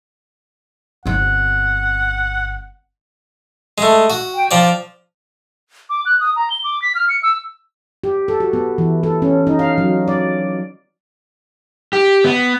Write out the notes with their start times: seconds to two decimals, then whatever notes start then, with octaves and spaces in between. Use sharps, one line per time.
1.06 G1 C4 F#5
3.78 G#3 A3
4.10 F#4
4.35 G5
4.51 F3 D5
5.90 D6
6.06 F#6
6.20 D#6
6.36 A#5
6.50 G7
6.64 D6
6.82 B6
6.95 F6
7.09 C#7
7.23 E6
8.04 G4
8.28 A4
8.40 F#4
8.53 B3
8.78 E3
9.03 A4
9.22 C#4
9.47 D#4
9.59 F5
9.78 F#3
10.08 D5
11.93 G4
12.24 B3